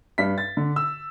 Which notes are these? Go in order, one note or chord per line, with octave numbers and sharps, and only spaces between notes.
G2 B6
A6
D3
E6